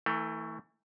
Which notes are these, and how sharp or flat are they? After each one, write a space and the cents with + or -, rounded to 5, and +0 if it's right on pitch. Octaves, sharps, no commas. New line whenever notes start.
E3 -25 A3 +20 E4 -25